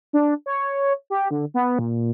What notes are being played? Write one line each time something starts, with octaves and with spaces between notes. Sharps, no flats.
D4
C#5
G4
D3
B3
A#2